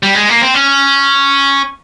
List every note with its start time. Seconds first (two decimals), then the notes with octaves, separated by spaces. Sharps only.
0.03 G3
0.15 G#3
0.29 A#3
0.42 C4
0.54 C#4